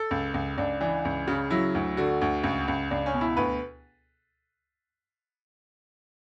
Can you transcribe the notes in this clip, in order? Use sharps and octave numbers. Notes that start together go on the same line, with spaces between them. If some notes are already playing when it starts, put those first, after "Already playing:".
Already playing: A4
C#2
C#2
C#2 D4
E3 D4
C#2
C#3
F#3 E4
D2
D3 F#4
D2
C#2
C#2
C#2 D4
C#4
B2
E4
D2 B4